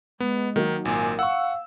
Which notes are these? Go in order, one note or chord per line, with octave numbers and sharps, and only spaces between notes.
G#3 B3
D#3 F#3 A#3 D#4
G#1 A#2 G#5
F5 F#5 C#6 E6